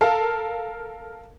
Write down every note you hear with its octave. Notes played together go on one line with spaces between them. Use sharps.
A4 A#4 F5